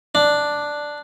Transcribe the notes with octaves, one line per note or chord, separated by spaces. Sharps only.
D4